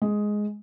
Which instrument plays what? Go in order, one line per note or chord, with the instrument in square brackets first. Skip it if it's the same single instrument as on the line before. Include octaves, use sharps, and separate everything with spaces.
[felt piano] G#3